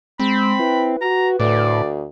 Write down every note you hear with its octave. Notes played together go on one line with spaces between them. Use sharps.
G#3 C4 B5
E4 B4
F#4 A#5
D2 A2 D5